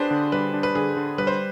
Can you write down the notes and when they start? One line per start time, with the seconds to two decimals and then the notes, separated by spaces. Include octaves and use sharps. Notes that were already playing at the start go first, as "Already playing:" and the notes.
Already playing: D4 G4 G#4 B4 C5
0.11 D3
0.32 G3 B4
0.54 D4
0.63 B4
0.75 D3 G#4
0.97 D3
1.18 G3 B4
1.27 C5